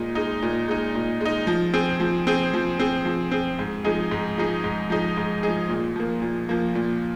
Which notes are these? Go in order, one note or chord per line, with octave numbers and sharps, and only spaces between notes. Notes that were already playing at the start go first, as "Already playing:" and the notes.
Already playing: A#2 G#3 D#4
G#3 D#4
A#2
G#3 D#4
A#2
G#3 D#4
F3
C4 G#4
F3
C4 G#4
F3
C4 G#4
F3
C4 G#4
G#2
F3 G#3 D#4 G#4
G#2
F3 G#3 D#4 G#4
G#2
F3 G#3 D#4 G#4
G#2
F3 G#3 D#4 G#4
A#2
F3 A#3
A#2
F3 A#3
A#2